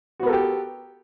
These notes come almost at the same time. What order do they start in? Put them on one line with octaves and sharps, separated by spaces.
F#4 B3 A#4 A4 G4